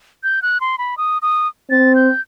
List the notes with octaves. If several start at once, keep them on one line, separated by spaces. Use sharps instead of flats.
G6
F#6
C6
B5
D#6
D#6
C4 A6
G6